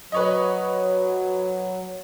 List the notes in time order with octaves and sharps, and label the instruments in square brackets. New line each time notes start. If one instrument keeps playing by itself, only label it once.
[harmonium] F#3 [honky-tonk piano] B4 C#5 D#5